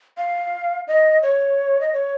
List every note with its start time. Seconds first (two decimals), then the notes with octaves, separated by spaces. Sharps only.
0.17 F5
0.87 D#5
1.22 C#5
1.81 D#5
1.93 C#5